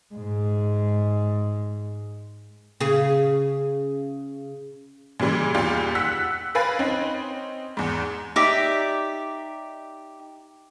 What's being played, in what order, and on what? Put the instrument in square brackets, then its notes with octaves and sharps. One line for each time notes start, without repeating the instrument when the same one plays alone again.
[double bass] G#2 G#3
[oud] C#3 G#4
[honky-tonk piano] A#2 C#3 E3 G3 G#3
E2 A#2 G3 F4 G4
F#5 E6 F#6 B6
A#4 B4 F5 G#5 B5 A6
C4 C#4 D#4
E2 G#2
[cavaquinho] D#4 G4 D5 E5